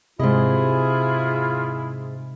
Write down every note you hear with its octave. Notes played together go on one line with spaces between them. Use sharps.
G#2 C3 E4 F4 G#4 D#5